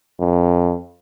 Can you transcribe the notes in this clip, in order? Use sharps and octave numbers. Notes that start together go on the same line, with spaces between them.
F2